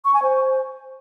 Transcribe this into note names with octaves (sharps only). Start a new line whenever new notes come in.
C#6
G#5
C5